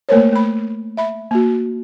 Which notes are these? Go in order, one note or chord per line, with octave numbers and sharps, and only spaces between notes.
A3 A#3 A#4 C5 C#5
A3 B5
E5 B5
A#3 F#4